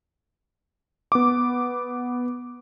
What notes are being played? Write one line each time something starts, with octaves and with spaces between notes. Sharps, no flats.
B3 D6